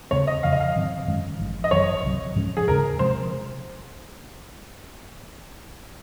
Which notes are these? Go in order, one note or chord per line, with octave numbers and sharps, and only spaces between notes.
D#2 C#3 G#3 C4 C#5
D#5
F2 C#3 F3 F5
D#5
F5
G#2 D#3 F#3 C4
F#2 D#3 G#3 C#4
G#1 G#2 F3
D#5
G#1 F#2 D#3 F#3 C#5
C2 C3 F#3
G#2 F3 G#3 C#4
G#4
D#2 C#3 G#3 A#4
C3 F3 G#3 C5